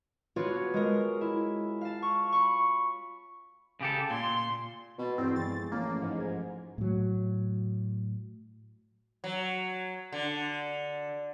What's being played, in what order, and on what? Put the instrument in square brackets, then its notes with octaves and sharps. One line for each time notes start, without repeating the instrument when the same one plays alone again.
[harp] B3 D4 F4 F#4 B4 C#5
G#3 C#4 A#4
E4
F5 A5
C#6
B5 C#6
[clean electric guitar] C#3 G4 A4
[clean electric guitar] A#2 [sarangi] C6
[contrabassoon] B2 [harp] C#6 A6
[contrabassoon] E2 [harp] G2 [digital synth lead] C4
[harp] F3 G#3 [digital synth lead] A6
[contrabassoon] A1 [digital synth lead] A#3
[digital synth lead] G#2
[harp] A#4 G#6
[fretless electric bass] A2 F#3
[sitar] F#3
D3